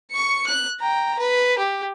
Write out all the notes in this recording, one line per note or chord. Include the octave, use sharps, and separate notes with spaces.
C#6 C#7
F#6
G5 A#5
B4
G4